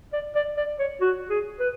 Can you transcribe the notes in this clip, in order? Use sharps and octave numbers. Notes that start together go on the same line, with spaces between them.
D5
D5
D5
C#5
F#4
G#4
B4